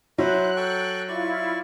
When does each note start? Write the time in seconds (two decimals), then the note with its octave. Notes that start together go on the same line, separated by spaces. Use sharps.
0.18 F#3 E4 C5 E5 F#6
0.57 A4 G5 C#6
1.08 E4 F4 D5 C#6